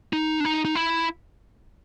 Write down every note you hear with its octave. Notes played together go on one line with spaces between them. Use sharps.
D#4
D4
D#4
D#4
E4